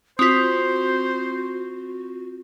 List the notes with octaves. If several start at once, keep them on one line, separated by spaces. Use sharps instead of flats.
C4 F4 F#4 C5 D#6 B6